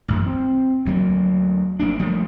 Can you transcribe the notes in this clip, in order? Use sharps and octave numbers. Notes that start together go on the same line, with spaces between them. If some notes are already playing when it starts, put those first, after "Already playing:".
A1 F#2
C4
D2 F#3 A#3
F1 A#3 D4
F3 G3 A3 A#3